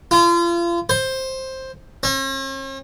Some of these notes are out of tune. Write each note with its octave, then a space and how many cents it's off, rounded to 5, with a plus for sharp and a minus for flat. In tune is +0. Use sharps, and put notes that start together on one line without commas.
F4 -35
C5 +10
C#4 -45